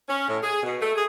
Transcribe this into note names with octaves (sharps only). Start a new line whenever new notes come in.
C#4
A2
G#4
B2
A3
G#4